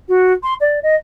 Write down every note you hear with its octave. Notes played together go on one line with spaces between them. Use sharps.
F#4
C6
D5
D#5